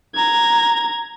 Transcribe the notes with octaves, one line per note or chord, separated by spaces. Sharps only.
A#5 G#6